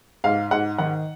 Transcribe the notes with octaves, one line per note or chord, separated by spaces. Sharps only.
G#2 F5
G#2 F#5
D#3 F#5